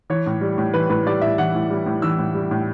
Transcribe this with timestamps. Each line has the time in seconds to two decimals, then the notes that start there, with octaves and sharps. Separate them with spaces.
0.10 E3 C#5
0.26 A2
0.41 G3
0.58 A2
0.74 E3 B4
0.90 A2 B4
1.06 G3 D5
1.21 A2 E5
1.38 E3 F#5
1.55 A2
1.70 G3
1.86 A2
2.02 E3 E6
2.18 A2
2.34 G3
2.51 A2